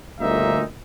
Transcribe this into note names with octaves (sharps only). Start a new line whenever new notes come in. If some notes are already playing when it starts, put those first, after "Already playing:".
G1 D2 A#2 A#3 D#4 E5